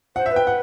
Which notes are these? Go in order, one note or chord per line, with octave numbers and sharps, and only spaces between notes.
C5 F#5
E5
B4
G5
F#5